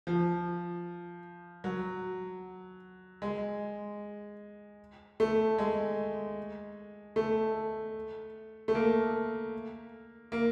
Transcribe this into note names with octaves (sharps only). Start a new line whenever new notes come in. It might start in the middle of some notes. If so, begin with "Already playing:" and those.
F3
F#3
G#3
A3
G#3
A3
A3
A#3
A#3